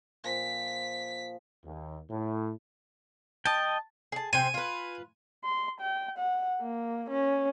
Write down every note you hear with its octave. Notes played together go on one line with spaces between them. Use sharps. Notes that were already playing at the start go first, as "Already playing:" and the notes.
A#2 F3 B6
D#2
A2
D#5 G5 A5
G#4 A5
C3 C5 G5 G#5
F4 B4
C6
G5
F#5
A#3
C#4